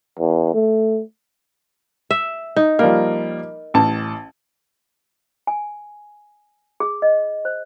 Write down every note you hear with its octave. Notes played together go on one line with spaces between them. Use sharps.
E2
A3
E5
D#4
F3 G3 A#3 A#4
A1 A5
G#5
G#4
D#5
C5